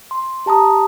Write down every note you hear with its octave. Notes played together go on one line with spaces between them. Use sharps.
C6
G4 A5 A#5 D#6